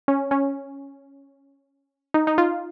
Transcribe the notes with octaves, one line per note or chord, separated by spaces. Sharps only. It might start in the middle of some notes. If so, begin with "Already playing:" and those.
C#4
C#4
D#4
D#4
F4